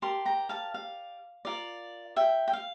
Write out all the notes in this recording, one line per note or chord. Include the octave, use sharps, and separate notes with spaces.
G4 A#4 D5 A5 C6
G5 A#5
F5 A5
F5
F4 A#4 D5
E5 G5
G5
F5